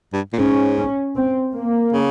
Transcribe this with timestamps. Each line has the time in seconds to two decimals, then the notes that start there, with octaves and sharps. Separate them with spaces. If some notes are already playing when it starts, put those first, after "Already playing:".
0.13 G2
0.33 A#2
0.38 G#2 C#4
0.77 C#4
1.16 C4
1.54 A#3
1.93 C#3